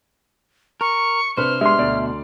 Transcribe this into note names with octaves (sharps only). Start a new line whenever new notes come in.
A#4 C#6
C3 D4 B4 C5 F6
G#3 B3 D4 G4 E5 C6
D2 B2 D5